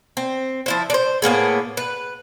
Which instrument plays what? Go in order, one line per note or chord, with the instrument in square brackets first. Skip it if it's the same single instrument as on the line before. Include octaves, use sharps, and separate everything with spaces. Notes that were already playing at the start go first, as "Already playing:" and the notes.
[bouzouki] C4
F3 E4 C5
D4 C5
A2 A#3 B3 G#4
B4